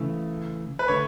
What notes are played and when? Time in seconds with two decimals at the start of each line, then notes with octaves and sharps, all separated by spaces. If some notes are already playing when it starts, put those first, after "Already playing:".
Already playing: C#3 E3 A3
0.79 B4
0.88 D3 A3 C#5